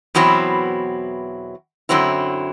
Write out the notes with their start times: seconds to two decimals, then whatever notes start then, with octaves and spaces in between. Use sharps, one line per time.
0.15 E2 B2 F#3 C4 E4
1.89 F#2 D3 F#3 C4 E4